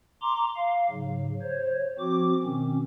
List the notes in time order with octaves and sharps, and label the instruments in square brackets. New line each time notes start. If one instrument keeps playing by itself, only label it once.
[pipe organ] A#5 C6 D6
F5
G#2 C#3 F#3
C5 C#5
F3 C4 F#4 D6
B2 D#3 C4 C#4